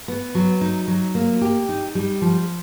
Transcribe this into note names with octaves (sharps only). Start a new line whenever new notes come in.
B3
F#3
D#4
F#3
A#3
G4
D#4
G3
F3